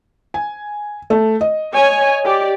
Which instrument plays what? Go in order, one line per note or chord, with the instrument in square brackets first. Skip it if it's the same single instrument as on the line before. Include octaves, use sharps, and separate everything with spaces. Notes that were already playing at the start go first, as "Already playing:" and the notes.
[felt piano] G#5
A3
D#5
[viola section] C#5 G#5
G4 D5